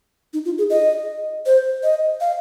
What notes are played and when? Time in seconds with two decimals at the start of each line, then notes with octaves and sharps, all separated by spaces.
0.34 D#4
0.45 F4
0.58 G#4
0.70 D#5
1.46 C5
1.83 D#5
2.21 F5